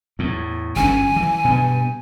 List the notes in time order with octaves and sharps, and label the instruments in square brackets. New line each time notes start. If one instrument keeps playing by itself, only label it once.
[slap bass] E2 A2
[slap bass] G1 F#2 C#4 [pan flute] G#5
[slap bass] E3
G2 B2